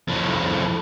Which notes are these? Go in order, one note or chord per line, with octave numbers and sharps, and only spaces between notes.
F2 A2